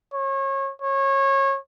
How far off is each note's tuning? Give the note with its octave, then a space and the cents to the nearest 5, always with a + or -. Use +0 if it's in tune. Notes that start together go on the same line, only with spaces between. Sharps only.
C#5 -30
C#5 -25